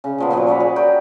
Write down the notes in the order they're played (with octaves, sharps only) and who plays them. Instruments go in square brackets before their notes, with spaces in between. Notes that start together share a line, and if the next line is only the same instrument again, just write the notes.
[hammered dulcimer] C#3
A#2 F3 B3
A#2 F3 F#3
C#5 D5 F#5 B5
G#4
F#4 G4 A#4 G5